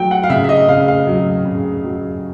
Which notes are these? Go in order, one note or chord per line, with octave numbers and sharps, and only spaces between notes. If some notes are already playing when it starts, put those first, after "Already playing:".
Already playing: F#3 A3 G5
F#5
F5
C#3 E5
E5
D#5
C#3 F5
F5
F#3
C#3
F#3